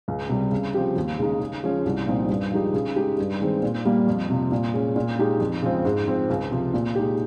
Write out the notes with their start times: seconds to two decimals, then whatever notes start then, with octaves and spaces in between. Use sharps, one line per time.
0.08 C#2
0.29 C3 G3
0.52 C#3
0.74 F3 C4 G4
0.97 D#2
1.19 C#3 G#3 D#4
1.40 C#3
1.63 F3 G#3 C#4
1.86 C2
2.07 A#2 F3 C4 D#4
2.29 G2
2.52 F3 G#3 D#4 G4
2.74 C#3
2.96 G#3 D#4 G4
3.18 G2
3.41 D#3 G#3 C4
3.62 A#2
3.85 G3 A#3
4.07 F2
4.30 C3 F3
4.52 A#2
4.74 G#3 C#4
4.96 A#2
5.19 G#3 D#4 G4
5.40 F2
5.62 C#3 F3 G#3 C4
5.85 G#2
6.08 F3 C4
6.30 C#2
6.51 C3 F3
6.74 A#2
6.95 G#3 D#4 G4